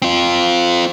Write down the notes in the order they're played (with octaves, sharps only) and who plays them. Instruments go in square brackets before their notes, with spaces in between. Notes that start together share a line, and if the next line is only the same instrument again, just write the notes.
[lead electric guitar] C4 F4